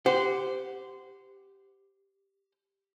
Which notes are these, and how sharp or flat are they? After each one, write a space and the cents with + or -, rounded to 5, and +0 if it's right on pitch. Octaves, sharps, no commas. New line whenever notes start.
G4 +0 C5 -20 F#5 +5